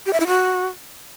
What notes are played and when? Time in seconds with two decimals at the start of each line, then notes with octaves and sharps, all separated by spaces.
0.06 G4
0.13 E5
0.20 E4
0.27 F#4